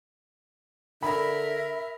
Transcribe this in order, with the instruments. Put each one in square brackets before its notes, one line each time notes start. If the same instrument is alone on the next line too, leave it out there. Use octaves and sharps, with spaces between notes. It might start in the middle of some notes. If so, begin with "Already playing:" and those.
[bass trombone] D3 [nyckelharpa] A#4 [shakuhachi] E5 [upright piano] B5